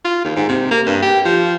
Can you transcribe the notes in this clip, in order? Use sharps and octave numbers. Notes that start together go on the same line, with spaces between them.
F4
D#2
G#2
C3
A#3
G2
G4
F3